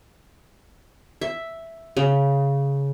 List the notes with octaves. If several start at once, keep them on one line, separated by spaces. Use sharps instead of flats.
E5
C#3